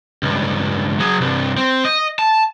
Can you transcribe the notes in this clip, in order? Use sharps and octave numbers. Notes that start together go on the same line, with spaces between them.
C#2 G2
F#3 G#4
C2 G2
C4
D#5
A5